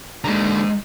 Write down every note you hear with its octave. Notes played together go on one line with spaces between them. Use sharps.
D#2 D3 G#3 A#5